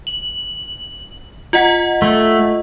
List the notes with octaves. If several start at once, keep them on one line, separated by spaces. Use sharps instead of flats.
F#7
F4 D#5 F#5
A3